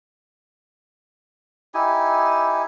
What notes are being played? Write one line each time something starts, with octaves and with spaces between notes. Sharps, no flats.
D#4 E4 G4 G#5